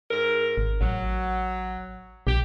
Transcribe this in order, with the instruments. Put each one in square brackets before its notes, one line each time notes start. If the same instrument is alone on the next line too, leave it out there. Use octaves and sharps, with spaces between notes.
[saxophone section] G#2 A#4
[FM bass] G#1
[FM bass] A1 [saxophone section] F#3
[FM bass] A#1 [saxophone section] G4